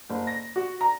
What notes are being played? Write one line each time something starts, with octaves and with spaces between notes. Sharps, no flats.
F#1
A#6
F#4
A#5